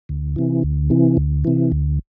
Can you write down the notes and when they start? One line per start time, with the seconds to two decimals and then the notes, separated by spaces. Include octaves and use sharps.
0.09 D2
0.36 C3 E3
0.63 D2
0.90 C3 E3
1.17 D2
1.45 C3 E3
1.72 D2